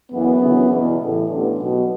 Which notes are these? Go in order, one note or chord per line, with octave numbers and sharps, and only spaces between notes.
F#1 F#2 E3 B3
G1 F#2 C#3 E3
E2 B2
A1 A2 E3
A1 G2 D3 B3
B1 B2